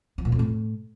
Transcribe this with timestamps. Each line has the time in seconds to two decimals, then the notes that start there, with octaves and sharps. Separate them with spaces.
0.18 F3
0.25 A#2
0.32 F2
0.39 A2